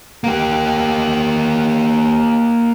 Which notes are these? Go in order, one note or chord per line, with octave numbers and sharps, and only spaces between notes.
A#3 G4